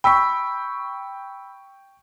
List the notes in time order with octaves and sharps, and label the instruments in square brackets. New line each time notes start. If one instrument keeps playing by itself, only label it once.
[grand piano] G5 C#6 [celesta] B5 E6 B6